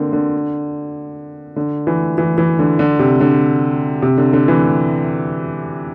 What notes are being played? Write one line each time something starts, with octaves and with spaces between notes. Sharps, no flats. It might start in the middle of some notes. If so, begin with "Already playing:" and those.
Already playing: D3 A#3 C4
D3
D3
E3
E3
E3
D3
D3
C3
D3
C3
D3
D3
E3